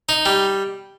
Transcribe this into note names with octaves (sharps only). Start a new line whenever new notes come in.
D#4
G3